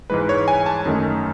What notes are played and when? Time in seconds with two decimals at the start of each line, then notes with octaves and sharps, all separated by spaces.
0.10 G#2 E3 G#3 B4
0.29 C#5
0.48 G#5
0.66 A5
0.85 F#2 D#3 A3 D#4